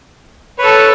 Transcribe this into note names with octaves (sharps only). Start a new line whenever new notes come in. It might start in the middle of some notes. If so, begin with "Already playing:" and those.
A4 B4 C#5